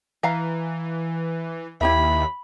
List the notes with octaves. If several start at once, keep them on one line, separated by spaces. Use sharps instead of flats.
E3 E5 F5 A#5
D#2 E4 G4 E5 B5